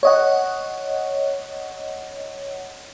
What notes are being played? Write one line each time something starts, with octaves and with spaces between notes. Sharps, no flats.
C#5 D#5 F#5